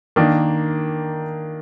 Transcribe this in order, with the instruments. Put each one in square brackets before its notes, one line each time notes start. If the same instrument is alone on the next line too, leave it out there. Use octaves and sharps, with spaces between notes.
[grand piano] D#3 A#3 D4